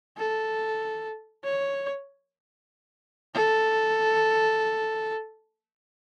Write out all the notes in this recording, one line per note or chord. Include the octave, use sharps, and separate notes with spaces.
A4
C#5
A4